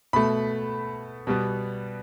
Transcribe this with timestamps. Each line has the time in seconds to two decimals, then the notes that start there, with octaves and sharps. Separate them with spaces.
0.13 B2 A3 B5
1.27 B2 G3 B3